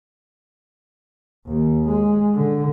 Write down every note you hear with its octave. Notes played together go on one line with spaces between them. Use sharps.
D#2
G#3
D3